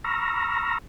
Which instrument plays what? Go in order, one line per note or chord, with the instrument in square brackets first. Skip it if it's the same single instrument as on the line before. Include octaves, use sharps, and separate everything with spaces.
[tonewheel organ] A#5 B5 C#6 E6 F6 A#6